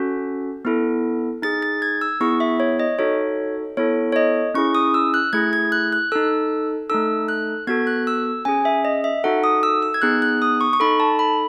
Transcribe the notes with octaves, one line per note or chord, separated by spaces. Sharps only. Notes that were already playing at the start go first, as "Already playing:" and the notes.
Already playing: C#4 F#4 A4
B3 E4 A4
D#4 G#4 A6
A6
G#6
E6
B3 E4 G#4 C#6
E5
C#5
D#5
D#4 F#4 A4 C#5
B3 E4 A4 C#5
C#5
D#5
C#4 E4 G#4 C#6
D#6
E6
F#6
A3 E4 G#4 G#6
G#6
F#6
F#6
D#4 A4 E6
A3 D#4 A4 E6
F#6
B3 F#4 A4 G#6
F#6
E6
C#4 G#4 G#5
E5
D#5
E5
D#4 F#4 A4 F#5
D#6
E6
E6
G#6
B3 D#4 G#4 F#6
F#6
D#6
C#6
C#6
D#4 A4 B5
A5
B5